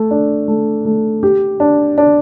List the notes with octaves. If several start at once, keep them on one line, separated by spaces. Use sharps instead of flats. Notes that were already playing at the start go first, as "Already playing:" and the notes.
Already playing: A3
D4
A3
A3
G4
D4
D4